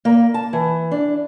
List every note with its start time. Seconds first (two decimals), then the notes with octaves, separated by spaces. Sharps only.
0.05 A#3
0.34 A5
0.53 E3
0.91 D4